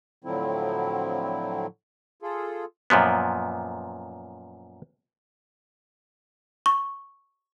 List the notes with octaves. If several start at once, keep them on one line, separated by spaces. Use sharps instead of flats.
A2 D3 F3 F#3 C4 E4
F4 G#4 A4
F#2 A#2 F3 B3
C#6